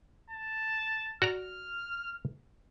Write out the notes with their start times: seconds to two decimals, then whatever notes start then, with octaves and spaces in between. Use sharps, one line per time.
0.30 A5
1.22 F#4 D5 A#5 F6